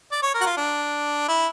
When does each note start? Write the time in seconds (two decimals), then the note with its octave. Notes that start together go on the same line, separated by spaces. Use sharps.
0.12 D5
0.23 C#5
0.34 A#4
0.41 F#4
0.46 F4
0.57 D4
1.28 E4